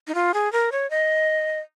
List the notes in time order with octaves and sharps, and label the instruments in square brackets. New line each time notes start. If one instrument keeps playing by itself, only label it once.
[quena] D#4
F4
G#4
A#4
C#5
D#5